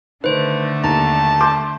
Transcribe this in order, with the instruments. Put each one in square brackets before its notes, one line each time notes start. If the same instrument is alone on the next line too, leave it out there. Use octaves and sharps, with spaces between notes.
[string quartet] D3 A3 [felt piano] D#3 [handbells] B4 C5
[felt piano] D#2 [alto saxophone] A5 [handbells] A#5
[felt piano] C6 D6 G6